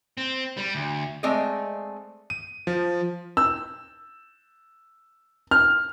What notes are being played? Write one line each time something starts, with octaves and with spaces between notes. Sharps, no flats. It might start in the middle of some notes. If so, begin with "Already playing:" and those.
C4
G3
D2
G#3 A3 C4 D5 D#5
D#7
F3
E6
F6